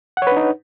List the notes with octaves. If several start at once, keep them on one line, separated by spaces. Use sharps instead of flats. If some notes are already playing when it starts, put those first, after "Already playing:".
D4 D#4 B4 C#5 F#5